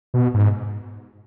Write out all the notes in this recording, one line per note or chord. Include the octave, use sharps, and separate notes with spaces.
B2
G#2